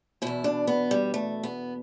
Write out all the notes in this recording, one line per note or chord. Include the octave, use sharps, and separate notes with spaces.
E2 B2 E4
D4
B3
G3
A3
B3